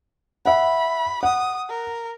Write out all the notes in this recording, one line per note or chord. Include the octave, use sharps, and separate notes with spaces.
E5 F#5 B5
F#5 D#6
A#4